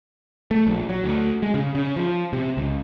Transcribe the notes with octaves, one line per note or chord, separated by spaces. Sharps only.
A3
A#1
F#3
D2
G#3
C#3
C#3
F3
C3
C#2